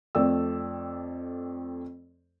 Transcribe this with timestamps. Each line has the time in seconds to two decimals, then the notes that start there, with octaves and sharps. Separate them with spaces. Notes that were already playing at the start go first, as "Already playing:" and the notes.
0.15 F2 A3 D5 G5 E6